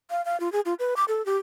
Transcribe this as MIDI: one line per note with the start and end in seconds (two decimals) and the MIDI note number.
0.10 0.24 77
0.25 0.39 77
0.40 0.51 65
0.52 0.61 68
0.65 0.74 65
0.79 0.94 71
0.96 1.05 86
1.08 1.24 69
1.26 1.37 67